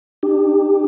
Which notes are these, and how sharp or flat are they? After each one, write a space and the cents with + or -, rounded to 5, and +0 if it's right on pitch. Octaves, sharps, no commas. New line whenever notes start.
D4 +35 G4 +15